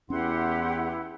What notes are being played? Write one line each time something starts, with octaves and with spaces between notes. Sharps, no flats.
E2 C#4 E4 G4 F#5 C6